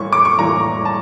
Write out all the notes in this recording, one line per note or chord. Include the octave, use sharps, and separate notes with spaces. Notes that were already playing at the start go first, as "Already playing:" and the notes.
Already playing: A2 E3 G3 A#3 C#6
D6
C#6
A2 E3 G3 A#3 A#5
A5